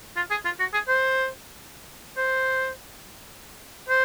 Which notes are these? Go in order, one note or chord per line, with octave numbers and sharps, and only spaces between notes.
F4
G#4
F4
F#4
G#4
C5
C5
C5